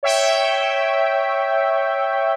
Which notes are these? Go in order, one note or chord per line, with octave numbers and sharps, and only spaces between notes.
C#5 E5 G5